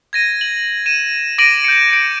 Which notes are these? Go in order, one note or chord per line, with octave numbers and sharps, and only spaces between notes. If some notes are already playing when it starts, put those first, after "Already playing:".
G#6 A#6 D#7
F#7
D#7 E7
D6 A#6 D7 D#7 F#7
G6 C#7
C#7 D7